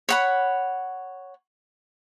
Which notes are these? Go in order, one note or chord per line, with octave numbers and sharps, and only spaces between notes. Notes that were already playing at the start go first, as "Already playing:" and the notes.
C#5 F#5 B5